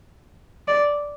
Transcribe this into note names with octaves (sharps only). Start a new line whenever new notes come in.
D5